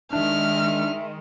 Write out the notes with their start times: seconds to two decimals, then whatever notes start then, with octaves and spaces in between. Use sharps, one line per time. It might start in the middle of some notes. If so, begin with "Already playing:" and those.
0.13 D#3 G#3 D4 E5 F6